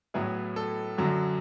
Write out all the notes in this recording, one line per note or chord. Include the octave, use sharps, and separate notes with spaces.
A2 F#3 B3 E4 G#4
A4
F#2 D3 F#3